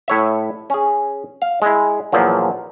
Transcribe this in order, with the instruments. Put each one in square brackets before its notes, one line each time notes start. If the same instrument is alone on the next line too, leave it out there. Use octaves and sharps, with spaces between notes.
[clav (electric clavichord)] A2 C#5 E5
C#4 G#4
F5
G#3 E4
E2 A#2 F3 F#3